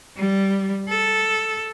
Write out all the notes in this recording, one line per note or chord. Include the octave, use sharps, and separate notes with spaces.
G3
A4